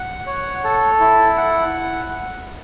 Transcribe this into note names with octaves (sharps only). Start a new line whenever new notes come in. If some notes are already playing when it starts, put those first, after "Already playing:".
Already playing: F#5
C#5
A4
E4
F#5